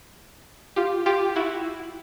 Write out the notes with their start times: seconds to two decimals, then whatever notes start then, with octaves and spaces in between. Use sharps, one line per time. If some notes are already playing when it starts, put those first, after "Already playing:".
0.76 F4 G4
1.06 F4 G4
1.36 E4 F#4